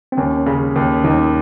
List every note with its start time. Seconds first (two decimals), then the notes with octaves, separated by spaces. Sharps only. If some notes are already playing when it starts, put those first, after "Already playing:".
0.12 C4
0.17 D#2 C#4
0.46 C#3
0.76 D#2
1.04 D#2 D#4